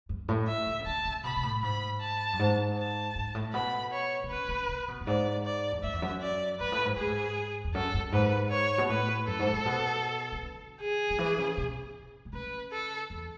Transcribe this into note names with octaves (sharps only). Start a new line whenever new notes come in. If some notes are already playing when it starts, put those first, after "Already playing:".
F#2
A2
E5
D3
C#3
D3 A5
C#3
B2 B5
B2
A2
G#2 B5
A5
F#2
G#2
A5
G#2
A2
B2 B5
C#5
B2
C#3 B4
C#3
C#3
B2
F#2
G#2 D5
D5
E2
F#2 E5
E2
F#2
D5
G#2 B4
A2
G#2
A2 G#4
G#2
E2
F#2 A4
F#2
G#2 B4
C#5
B2
A2 B4
F#2 A4
G#2
A2
B2
E3
D3
G#4
D3
E3
C#3
B2
B2
C#3 B4
A4
E2